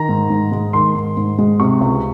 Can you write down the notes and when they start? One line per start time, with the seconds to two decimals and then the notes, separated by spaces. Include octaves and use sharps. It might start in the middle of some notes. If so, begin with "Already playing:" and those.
Already playing: D#3 A#5
0.09 G#2
0.30 G#2
0.52 G#3
0.73 D#3 C6
0.95 G#2
1.17 G#2
1.38 G#3
1.60 C3 C#6
1.81 C#2